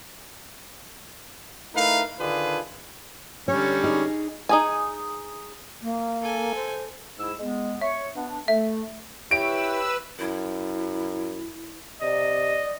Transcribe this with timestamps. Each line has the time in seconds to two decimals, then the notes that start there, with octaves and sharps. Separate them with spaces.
1.75 A3 D#4 E4 A#4 B4 F5
2.19 D3 D#3 D4 F4 G#4 B4
3.48 D3 G3 C#4 C#5
3.84 D#4 G#4
4.49 D#4 G#4 G#5
5.82 A#3
6.21 A4 G#5
6.55 C5
7.19 G#2 E4 E6
7.39 G#3 B3
7.81 C#5 E5 C#6
8.15 B3 D4
8.48 A3 E5
9.31 E4 G4 B4 C#5 E6 D7
10.19 F#2 E4
12.02 C3 D5 D#5